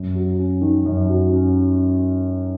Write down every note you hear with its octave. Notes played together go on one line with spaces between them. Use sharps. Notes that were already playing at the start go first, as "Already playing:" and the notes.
Already playing: F#2
F#3
C#4
D#3
F#2
F#3
C#4